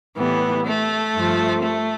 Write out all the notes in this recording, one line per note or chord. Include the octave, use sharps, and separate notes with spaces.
A2 E3 G3 B3
A3
G2 F3
A3